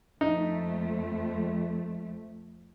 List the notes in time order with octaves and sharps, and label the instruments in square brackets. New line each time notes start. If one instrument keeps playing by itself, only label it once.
[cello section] F2 A3 [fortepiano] D#4